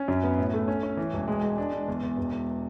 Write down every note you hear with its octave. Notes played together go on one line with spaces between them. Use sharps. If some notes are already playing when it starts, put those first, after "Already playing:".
Already playing: C#4
F#2
B3
A2
A3
C#4
C#4
E3
E1
G#3
G#3
D4
D4
E2
E2
E1
E2